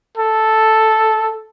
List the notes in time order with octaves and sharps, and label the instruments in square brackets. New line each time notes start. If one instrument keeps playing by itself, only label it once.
[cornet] A4